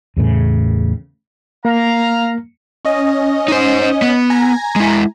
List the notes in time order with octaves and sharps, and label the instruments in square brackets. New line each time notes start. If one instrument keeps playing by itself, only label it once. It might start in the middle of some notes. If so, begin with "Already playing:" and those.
[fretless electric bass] E2 A2 C#3
[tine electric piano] A#3 [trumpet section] F5 A#5
[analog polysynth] C#4 D#5
[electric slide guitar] D#4 C5
B3
[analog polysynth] G#5 A#5
[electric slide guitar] G#3 E4